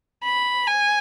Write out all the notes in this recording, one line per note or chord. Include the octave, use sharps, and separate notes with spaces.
B5
G#5